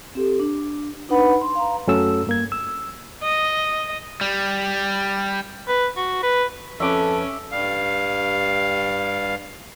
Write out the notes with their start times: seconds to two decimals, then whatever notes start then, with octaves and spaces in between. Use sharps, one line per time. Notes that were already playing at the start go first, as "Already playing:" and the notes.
0.15 C4 G4 A4
0.40 D4
1.09 D4 D#4 B4 F#5 B5
1.41 C6
1.55 F5 A#5
1.87 F#2 A3 C#4 F#4 A4 E6
2.27 G2 A#3 G#6
2.52 E6
3.23 D#5
4.21 G3
5.68 B4
5.97 F#4
6.23 B4
6.80 F2 C#4 A4 B4 E5 D6
7.52 G2 G3 F5